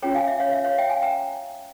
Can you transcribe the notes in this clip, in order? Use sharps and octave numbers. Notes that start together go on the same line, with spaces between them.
C#4 F4 G#4 C#5 G5 A#5
F5 G#5
E5
C#5 F5
E5
C#5 F5
E5 G5
F5 G#5
G5 A#5